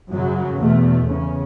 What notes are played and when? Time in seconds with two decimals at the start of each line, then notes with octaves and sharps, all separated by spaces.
0.11 F#2 C#3 F#3
0.59 E2 B2 A3
1.07 E2 C#3 C#4